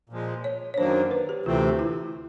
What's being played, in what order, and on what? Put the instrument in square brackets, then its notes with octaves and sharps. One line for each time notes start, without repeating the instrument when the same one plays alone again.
[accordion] A#2 F3 G#3
[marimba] C#5
C#5
[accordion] F#2 D#3 F#3 A#3 D4 [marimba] C5
[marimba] B4
G4
[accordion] D2 C3 E3 A3 C4 [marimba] F4
[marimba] E4